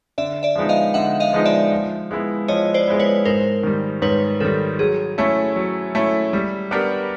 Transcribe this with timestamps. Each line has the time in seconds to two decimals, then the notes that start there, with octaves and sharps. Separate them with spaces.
0.18 D3 D5 E5
0.43 D5 E5
0.56 F3 G#3 B3 D#4
0.69 D#5 F5
0.94 D3 E5 F#5
1.20 D#5 F5
1.33 F3 G#3 B3 D#4
1.45 D5 E5
1.72 F3
2.11 G#3 B3 E4
2.48 F3 C#5 D#5
2.74 C5 D5
2.88 G#3 B3 E4
2.99 B4 C#5
3.25 G#2 A#4 C5
3.63 D#3 G3
4.02 G#2 B4 C#5
4.40 D#3 G3 A4
4.79 F#3 G#4
5.18 A3 C#4 E4
5.56 F#3
5.95 A3 C#4 E4
6.33 G3
6.71 B3 D4 G4 A#4